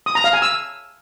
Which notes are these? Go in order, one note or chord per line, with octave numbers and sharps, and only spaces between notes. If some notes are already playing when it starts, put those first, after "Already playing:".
D#6
A#5
F5
G#5
E6